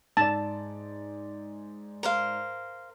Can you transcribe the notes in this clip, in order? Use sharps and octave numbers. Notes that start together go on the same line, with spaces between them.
G#2 D5 A5
A#4 C5 F5